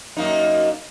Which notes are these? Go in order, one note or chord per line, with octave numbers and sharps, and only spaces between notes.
F#2 A#3 D#4